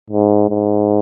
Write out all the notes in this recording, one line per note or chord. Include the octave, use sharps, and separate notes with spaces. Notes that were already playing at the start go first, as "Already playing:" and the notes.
G#2
G#2